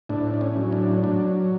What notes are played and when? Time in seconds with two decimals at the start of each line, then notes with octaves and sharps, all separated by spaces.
0.09 A2 D4
0.34 D4
0.41 C#4
0.57 F#3
0.72 D4
1.04 F#3 D4